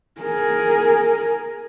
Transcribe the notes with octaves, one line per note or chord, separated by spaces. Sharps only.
G#4 A#4